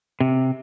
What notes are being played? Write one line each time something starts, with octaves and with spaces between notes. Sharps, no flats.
C3